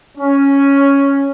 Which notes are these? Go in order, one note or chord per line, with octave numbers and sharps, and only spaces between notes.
C#4